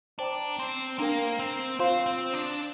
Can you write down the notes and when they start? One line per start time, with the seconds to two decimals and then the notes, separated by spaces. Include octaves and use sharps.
0.19 D4 C5 G5 A#5 D6
0.59 C4
0.99 A#3 D4 A#4 G5
1.39 C4
1.79 C4 F4 C5 F5 C6
2.06 C4
2.33 D4